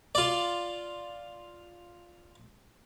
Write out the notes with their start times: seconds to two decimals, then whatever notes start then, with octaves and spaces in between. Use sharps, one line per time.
0.15 F4 D5